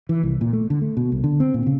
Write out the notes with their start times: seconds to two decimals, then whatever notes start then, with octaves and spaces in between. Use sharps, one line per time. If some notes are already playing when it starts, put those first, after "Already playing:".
0.09 E3
0.23 C2
0.41 A#2
0.53 A3
0.70 D3
0.82 A3
0.97 B2
1.12 C2
1.24 D3
1.40 C4
1.54 A#2
1.67 C#3